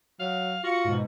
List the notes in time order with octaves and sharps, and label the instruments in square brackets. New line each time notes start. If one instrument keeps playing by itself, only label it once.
[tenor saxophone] F#3 [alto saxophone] F5
[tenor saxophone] F4 [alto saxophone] F#4 [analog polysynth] A#6 C#7
[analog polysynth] G#2 B2